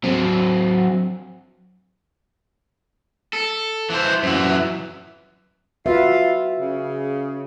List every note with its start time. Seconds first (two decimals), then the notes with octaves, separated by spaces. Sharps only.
0.04 F#3 C4
3.33 A4
3.90 E3 C5
4.23 F#2 E3
5.86 F4 F#4 B4 E5
6.59 C#3